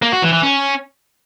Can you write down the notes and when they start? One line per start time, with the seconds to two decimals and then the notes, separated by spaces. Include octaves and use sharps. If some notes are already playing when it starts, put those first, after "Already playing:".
0.02 A#3
0.12 F#4
0.22 E3
0.33 E3
0.43 C#4